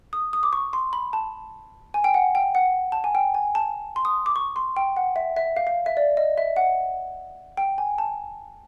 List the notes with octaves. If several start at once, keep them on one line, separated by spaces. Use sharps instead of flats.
D#6
D#6
D6
C#6
C6
B5
A5
G#5
G5
F#5
G5
F#5
A5
G#5
G5
G#5
A5
C6
D#6
D6
C#6
C6
G5
F#5
E5
E5
F5
F5
E5
D5
D#5
E5
F#5
G5
G#5
A5